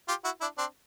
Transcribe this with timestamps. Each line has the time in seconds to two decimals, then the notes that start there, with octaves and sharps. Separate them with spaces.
0.08 F4 G4
0.24 E4 F#4
0.41 D4 E4
0.58 C4 D4